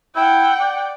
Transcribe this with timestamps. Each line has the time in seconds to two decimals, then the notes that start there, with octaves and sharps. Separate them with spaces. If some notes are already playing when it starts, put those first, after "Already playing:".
0.16 E4 F#5 G5
0.60 D5